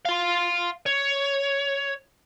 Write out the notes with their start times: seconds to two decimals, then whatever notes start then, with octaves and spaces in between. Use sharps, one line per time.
0.05 F5 C6
0.86 C#5